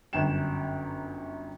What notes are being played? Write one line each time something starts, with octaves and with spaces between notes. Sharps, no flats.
G1 F#2 G5 E7